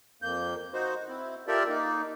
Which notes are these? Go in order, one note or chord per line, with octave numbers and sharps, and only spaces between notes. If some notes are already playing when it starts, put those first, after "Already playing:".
F2 A#3 G6
D#4 F#4 C5
C4 E4
F4 G4 A4 A#4 D5 E5
A#3 D#4